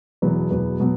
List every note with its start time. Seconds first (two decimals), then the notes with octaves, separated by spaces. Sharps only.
0.22 E1 E2 B2 F#3 B3
0.50 E1 E2 B2 F#3 B3
0.80 B2 F#3 B3